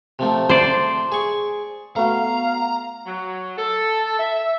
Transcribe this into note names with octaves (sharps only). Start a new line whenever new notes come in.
C3 F3 A3
C5 D5
G#4 C#6
A3 B3 F#4 F5 A#5
F#3
A4
E5